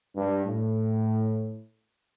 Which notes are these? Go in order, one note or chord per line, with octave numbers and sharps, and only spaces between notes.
G2
A2